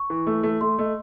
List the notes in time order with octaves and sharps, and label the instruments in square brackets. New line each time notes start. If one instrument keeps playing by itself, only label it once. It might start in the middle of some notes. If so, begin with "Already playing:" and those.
Already playing: [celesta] C#6
[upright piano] E3
A3
A3
[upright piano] A3 [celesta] C6
[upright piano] A3 [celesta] D#5